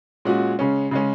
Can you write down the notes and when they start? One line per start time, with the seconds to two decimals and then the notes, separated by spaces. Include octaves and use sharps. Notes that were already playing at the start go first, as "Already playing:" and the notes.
0.25 A#2 G#3 C#4 F#4
0.59 C#3 G#3 C#4
0.91 C#3 G#3 C#4